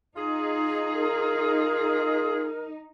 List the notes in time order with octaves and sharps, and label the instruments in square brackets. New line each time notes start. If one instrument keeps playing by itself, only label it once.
[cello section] D#4 [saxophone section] F4 G#4
[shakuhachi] A#4